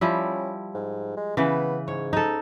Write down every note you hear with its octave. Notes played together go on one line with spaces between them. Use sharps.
F3 G3 C#4 E4
G#2
G#3
C#3 E3 B3 B4
G#2 C#5
D#4 A4